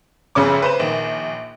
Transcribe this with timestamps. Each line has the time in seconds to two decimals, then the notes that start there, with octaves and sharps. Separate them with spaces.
0.35 F1 F2 C#3 C#4 D6
0.62 B4 C5 E7
0.80 A#1 D#3